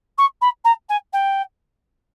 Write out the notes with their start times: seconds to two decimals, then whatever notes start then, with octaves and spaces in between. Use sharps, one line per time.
0.18 C#6
0.41 B5
0.64 A#5
0.89 G#5
1.13 G5